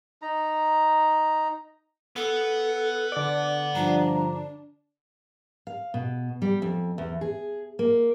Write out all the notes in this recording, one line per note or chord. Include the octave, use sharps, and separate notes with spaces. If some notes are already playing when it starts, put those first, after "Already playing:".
D#4 A#5
B3 A4
D3 D5
G2 F3 D4 A#5
F5
B2
G3
F2
E2
G#4
A#3